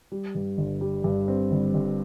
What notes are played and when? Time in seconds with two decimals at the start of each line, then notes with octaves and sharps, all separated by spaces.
0.12 G3
0.35 G2
0.58 G1
0.81 G3
1.04 G2
1.28 C4
1.51 G1
1.74 G1